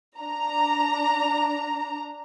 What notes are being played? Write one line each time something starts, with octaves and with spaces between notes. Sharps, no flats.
D4 A#5